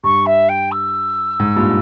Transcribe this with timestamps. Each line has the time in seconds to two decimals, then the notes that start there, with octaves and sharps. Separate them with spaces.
0.04 G2 C#6
0.26 E5
0.49 G5
0.71 E6
1.40 G#2
1.56 G2 A#2